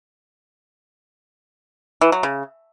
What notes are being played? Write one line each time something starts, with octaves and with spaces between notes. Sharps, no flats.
E3
F#3
C#3